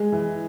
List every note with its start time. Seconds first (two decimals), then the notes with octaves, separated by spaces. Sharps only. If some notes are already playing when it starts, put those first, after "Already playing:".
Already playing: G#3 G#4
0.12 E3